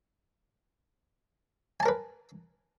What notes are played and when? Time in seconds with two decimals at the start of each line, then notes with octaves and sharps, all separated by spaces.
1.80 G#5
1.83 A5
1.86 A#4
1.88 B4